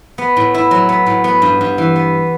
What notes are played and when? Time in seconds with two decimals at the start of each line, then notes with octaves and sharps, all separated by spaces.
0.18 B3
0.37 A2
0.54 E4
0.71 F#3
0.89 B3
1.06 A2
1.24 B3
1.42 G2
1.61 G2
1.78 E3
1.96 B3